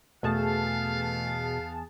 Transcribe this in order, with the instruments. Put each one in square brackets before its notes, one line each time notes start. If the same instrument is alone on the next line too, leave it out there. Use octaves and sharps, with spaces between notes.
[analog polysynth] E2 G#4 A5 [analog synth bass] B2 [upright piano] A3 [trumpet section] B3 F5